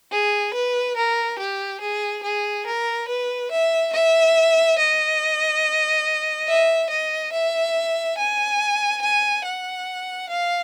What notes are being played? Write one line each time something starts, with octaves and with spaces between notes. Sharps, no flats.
G#4
B4
A#4
G4
G#4
G#4
A#4
B4
E5
E5
D#5
E5
D#5
E5
G#5
G#5
F#5
F5